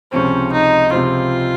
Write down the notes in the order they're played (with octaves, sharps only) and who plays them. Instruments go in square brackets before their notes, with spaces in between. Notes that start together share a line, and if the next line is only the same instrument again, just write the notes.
[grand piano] C#2 C3 F3 C4 [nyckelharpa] C#4
[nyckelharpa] D#4
[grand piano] C#2 C3 F3 C4 [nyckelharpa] F4